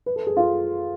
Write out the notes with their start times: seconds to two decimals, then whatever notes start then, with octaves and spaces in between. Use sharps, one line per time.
0.06 B4
0.16 A4
0.27 G#4
0.37 F4